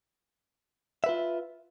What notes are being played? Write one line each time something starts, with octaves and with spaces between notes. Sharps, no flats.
F4 B4 E5